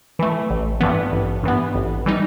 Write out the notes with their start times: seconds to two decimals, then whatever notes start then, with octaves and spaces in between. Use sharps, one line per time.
0.19 E3 A3
0.50 A1
0.80 G2 E3 B3
1.12 A1
1.43 G2 E3 B3
1.75 A1
2.06 E3 G3 D#4